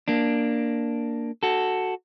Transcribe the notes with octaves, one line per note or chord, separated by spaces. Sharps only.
A#3 D4
F#4 A4